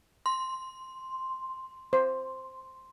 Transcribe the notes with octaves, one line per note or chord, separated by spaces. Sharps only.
C6
C5